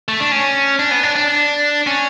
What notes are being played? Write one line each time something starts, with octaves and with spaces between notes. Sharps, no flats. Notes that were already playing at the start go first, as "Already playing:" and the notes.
A3
D4
C#4
D4
B3
D4
D4
C#4